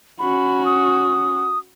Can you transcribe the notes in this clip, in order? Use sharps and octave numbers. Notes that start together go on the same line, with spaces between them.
C#4 F#4 B5
D#6